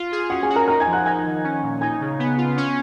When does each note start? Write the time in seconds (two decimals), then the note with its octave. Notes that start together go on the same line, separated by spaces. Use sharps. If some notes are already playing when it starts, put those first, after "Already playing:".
Already playing: F4
0.12 G#4
0.30 C#4 F#4 F#5
0.43 G#4 G#5
0.49 F#4
0.56 A#4 A#5
0.68 D#4 A#4 A#5
0.80 G#5 G#6
0.87 F3
0.93 F#5 F#6
1.06 D#4 G#5 G#6
1.25 D#3
1.44 C#4
1.62 A#2
1.81 D#4 G#5 G#6
2.01 C#3
2.19 B3
2.38 F4
2.57 C#4